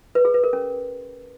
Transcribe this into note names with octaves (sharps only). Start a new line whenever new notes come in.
B4
G#4
B4
A#4
C#4